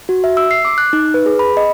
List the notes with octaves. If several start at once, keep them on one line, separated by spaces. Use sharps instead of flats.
F#4
E5
E6
C7
D6
F#6
D#4
B4
G#4
B5
D#5